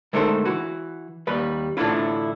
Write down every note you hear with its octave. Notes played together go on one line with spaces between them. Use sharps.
D3 G#3 A3 D#4 A#4 C5
E3 F#4
D#2 G3 B4
A2 D3 E3 D4 E4 F4